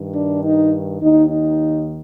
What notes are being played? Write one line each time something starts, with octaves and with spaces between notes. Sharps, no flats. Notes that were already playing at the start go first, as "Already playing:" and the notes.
Already playing: G2 D#3
D4
D#4
D#2 D#3 D#4
D#4